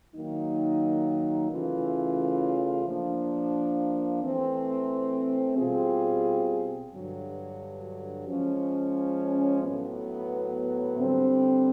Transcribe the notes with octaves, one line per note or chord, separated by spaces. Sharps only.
D#3 F#3 A#3 D#4
C#3 E3 A3 C#4 F4
F3 A#3 D4
E3 A3 C4
B2 G3 C4 F4 G#4
G2 D3 F#3
F3 G#3 C#4
A2 F#3 B3
D3 G3 C4